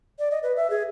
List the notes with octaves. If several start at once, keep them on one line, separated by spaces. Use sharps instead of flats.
D5
D#5
B4
E5
G#4